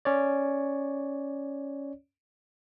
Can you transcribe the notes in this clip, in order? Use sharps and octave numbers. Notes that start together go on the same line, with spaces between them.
C#4 C#5 D5